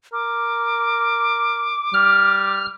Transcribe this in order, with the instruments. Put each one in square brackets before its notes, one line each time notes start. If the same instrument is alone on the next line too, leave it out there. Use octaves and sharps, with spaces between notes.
[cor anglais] A#4 [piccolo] D6
[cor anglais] G3 [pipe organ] F6